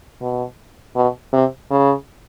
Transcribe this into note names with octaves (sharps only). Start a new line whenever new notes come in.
B2
B2
C3
C#3